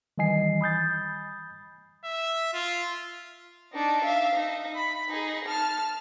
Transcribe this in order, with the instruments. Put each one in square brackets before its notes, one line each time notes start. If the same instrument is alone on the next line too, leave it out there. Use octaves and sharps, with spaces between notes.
[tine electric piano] D#3 E3 G3 D#5 G#5 C7
B5 D#6 G6 A6
[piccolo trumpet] E5
F4
[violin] D4 D#4
E5 F5
D#4
B5
D#4 G#4
A5 F6